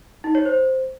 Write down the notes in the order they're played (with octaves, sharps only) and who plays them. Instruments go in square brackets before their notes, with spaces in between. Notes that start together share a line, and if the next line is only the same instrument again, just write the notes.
[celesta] D#4
C#5
C5